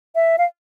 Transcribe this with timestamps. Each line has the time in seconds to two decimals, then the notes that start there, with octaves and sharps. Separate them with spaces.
0.15 E5
0.38 F5